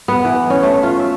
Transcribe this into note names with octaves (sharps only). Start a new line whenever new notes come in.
B3
E3
C#4
A3
F4
E5